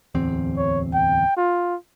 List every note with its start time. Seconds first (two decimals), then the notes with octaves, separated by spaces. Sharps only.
0.15 D1 E2 C4
0.57 C#5
0.94 G5
1.37 F4